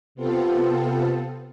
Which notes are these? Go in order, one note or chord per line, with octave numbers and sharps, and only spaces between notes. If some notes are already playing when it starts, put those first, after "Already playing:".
C3 B3 C4 F4 A4